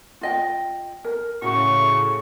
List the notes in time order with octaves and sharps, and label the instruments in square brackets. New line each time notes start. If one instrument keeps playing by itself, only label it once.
[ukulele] F4 D#5 G5
A#4
[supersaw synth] A2 C#3 [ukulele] F#4 [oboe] C#6